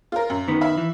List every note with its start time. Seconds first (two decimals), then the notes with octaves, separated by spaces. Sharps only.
0.12 F4 A#4
0.30 F#2
0.48 D#3 B3
0.61 E5 F5 B5
0.78 E3